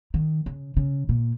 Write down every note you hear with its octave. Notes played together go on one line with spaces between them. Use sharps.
D#3
C#3
C#3
A#2